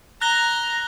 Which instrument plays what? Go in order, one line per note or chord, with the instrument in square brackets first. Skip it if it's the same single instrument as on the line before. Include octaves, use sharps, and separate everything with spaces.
[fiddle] A#5 [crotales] F#6 A#6 G7